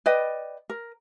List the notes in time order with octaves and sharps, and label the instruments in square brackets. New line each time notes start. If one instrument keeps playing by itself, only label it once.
[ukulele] B4 D5 D#5 G5
A#4